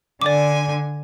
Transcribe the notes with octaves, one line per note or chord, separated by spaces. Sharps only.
D3 D5 G#5 D6